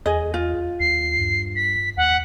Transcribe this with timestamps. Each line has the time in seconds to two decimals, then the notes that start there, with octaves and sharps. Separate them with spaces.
0.06 E2 G#4 D#5
0.34 F4
0.80 D#2 C7
1.19 G2
1.56 B6
1.97 D#2 F#5